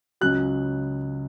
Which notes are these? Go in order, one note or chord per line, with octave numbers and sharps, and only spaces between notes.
C#2 C#3 F#3 F#6